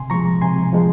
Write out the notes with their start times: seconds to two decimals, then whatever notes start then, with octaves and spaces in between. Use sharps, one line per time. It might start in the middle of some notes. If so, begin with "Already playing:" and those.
Already playing: C3 G#5 C6
0.10 F3 G#3 A#5 C#6
0.41 C3 G#5 C6
0.73 F3 G#3